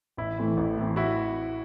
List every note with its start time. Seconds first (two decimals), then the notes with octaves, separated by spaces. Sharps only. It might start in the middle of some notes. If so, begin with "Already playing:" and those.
0.17 A1 E4
0.38 A2 E3 A3 C4
0.57 A1
0.77 A2 E3 A3 C4
0.96 E4 F#4